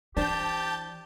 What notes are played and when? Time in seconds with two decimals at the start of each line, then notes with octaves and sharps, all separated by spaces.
0.17 E3 D4 G4 C5 A5 G6